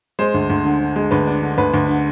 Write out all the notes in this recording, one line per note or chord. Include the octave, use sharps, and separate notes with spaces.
G#3 C5
D2
D2
D3
D3
G#3
D2 B4
D4
D3
D2 B4
D2
D3